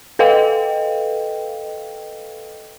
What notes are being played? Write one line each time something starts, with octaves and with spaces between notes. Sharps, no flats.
A4 B4 D#5 F5 G5